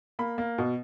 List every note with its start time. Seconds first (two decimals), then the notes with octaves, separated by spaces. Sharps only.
0.19 A#3 B5
0.38 A#3
0.58 B2